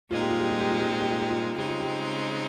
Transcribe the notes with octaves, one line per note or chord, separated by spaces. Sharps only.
A#2 G#3 C4 D#4 F4
G4
F4
G4
F4
G4
F4
G4
F4
G4
F4
G4
F4
C#3 G#3 C4 D#4 G4
F4
G4